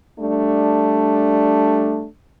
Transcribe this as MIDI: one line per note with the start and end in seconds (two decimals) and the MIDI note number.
0.20 2.07 55
0.20 2.07 57
0.20 2.07 62